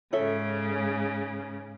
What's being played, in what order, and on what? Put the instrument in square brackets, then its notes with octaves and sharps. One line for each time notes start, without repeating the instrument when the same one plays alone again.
[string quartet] G#2 C#3 [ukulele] A4 C#5 E5